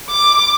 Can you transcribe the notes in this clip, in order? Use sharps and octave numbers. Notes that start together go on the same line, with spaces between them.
D6